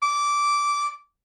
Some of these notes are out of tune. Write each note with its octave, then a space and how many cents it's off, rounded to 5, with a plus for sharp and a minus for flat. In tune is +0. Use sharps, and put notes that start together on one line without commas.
D6 -15